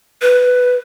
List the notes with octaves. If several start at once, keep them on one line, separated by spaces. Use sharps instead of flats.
B4